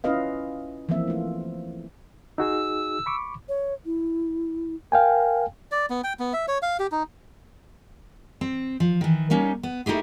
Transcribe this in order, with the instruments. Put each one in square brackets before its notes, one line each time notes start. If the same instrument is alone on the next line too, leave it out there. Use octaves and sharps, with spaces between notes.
[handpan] C#4 E4 F4 B4 D#5 F5
E3 F3 A#3 C4 E5
A3 F4
[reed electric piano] D#4 F#4 G#4 [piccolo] E6
[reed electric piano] B5 C#6 D6
[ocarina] C#5
E4
[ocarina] A#4 [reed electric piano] F5 G5 G#5
[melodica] D5
B3
G5
B3
E5
C#5
F5
G4
D#4
[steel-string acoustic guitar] C4
F3
D#3 E3
G3 A#3 C#4 D#4
B3
A3 D#4 E4 G4 G#4